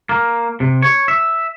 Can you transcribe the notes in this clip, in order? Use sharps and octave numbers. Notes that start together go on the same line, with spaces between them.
A#3
C3
C#5
E5